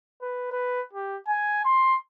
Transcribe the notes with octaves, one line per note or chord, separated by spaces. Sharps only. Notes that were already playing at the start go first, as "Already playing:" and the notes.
B4
B4
G4
G#5
C6